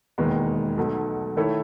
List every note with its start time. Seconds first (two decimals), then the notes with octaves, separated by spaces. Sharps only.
0.18 E1 D#2 D#3 G#3 B3
0.77 B1 B2 A3
1.36 D#3 A3 E4 A4 C#5